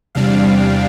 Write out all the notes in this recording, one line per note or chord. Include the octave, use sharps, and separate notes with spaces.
E2 C3 G3 D4 F5